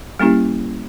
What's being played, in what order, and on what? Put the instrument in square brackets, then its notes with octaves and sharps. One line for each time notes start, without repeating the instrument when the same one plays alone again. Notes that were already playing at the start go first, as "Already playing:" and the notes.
[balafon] G3 A#3 C#4 E4 G4